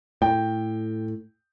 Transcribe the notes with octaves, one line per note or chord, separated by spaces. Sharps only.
A2 G5